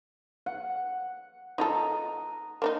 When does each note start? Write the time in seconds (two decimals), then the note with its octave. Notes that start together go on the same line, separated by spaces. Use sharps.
0.46 F#5
1.58 D#4 F4 A4 D#5 A#5
2.62 A#3 D4 D#4